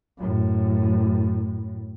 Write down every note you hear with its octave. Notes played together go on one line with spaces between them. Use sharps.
F#2 A2